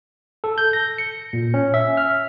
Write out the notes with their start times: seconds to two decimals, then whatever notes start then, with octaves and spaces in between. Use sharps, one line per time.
0.44 A4
0.58 G6
0.73 A#6
0.98 C#7
1.33 A#2
1.54 C#4
1.74 E5
1.97 F6